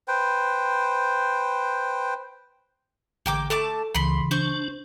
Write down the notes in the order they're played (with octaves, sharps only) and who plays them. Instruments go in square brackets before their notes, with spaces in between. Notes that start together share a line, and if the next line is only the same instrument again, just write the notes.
[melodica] B4 C5 G5
[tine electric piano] A1 D3 [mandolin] A#3 G5 D6
[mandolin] A3 A5 D6 [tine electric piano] A4
[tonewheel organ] C#2 [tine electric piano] C#3 E3 [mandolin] B5 C6
[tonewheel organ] D4 [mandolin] C5 C#6